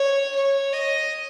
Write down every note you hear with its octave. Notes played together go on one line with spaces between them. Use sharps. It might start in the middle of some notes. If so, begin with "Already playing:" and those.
Already playing: C#5
C#5
D#5